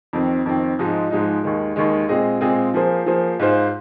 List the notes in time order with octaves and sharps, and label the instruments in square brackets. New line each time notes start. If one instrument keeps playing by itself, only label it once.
[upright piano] F2 D#3 C4
F2 D#3 C4
G#2 F3 G#3 D#4
G#2 F3 G#3 D#4
D#2 D#3 G#3
D#2 D#3 G#3
A#2 G#3 C4 G#4 D#5
A#2 G#3 C4 G#4 D#5
F3 A#3 G#4 C5
F3 A#3 G#4 C5
G#2 G#3 F4 C5